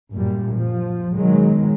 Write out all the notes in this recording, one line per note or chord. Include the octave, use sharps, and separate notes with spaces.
F#2 A#2 G3
F3
B2 D#3 F#3 G#3